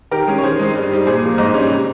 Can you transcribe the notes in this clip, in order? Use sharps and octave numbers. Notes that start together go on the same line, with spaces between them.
D#3 G4 A#4
G#3 C#4
C#5
D#3 G#4 C5
G#3 C4 D#4
G2
G3 C4 D#4
A#2 G#4 C5
F3 A#3
G#2 C5 D#5
G3 C#4
C3